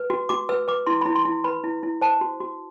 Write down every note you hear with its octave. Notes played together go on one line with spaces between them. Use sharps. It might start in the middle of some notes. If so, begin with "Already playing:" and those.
Already playing: B4
F#4
F#4 D6
B4 E6
B4 D6
E4 C6
B5
E4
C6
E4
B4 B5
E4
E4
C5 A5
F#4
F#4